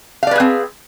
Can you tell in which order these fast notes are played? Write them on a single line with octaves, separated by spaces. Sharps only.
F5 D5 B4 G#4 C4